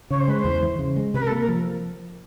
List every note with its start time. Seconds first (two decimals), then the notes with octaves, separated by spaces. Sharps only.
0.10 C#3 C#5
0.19 C5
0.28 G#3 B4
0.38 C5
0.44 E2
0.62 E3
0.79 C#3
0.96 G#3
1.14 C3 B4
1.21 A#4
1.26 A4
1.32 A#3
1.40 A#4
1.48 F3